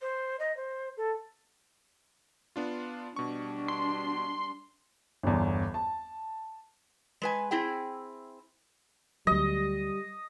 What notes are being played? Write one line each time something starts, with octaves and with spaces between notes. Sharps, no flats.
C5
D#5
C5
A4
B3 D4 F4
B2 G3 D4 C#6
C6
G1 E2
A5
G#3 B4 G#5
C4 E4 G#4 G5
D2 F#3 G3 D#5